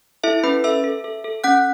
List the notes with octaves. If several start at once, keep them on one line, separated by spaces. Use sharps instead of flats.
E4 A4 E5
C#4 B4 B5
A4 E5 E6
A4
A4
A4
C#4 F#5 F#6